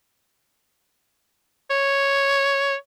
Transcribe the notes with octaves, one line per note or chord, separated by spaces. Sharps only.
C#5